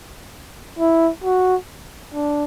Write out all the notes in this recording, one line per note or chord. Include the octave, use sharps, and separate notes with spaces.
E4
F#4
D4